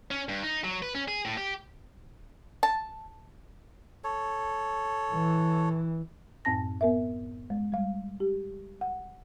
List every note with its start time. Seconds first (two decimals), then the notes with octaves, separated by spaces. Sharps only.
0.11 C#4
0.29 G2
0.43 D#4
0.64 F#3
0.82 B4
0.94 C#4
1.08 G#4
1.25 A2
1.37 G4
2.63 A5
4.04 A4 C#5
5.13 E3
6.45 F#2 A2 C4 A5 A#6
6.81 B3 A#4 E5
7.50 G#3
7.72 G3 F5
8.20 G4
8.81 F#5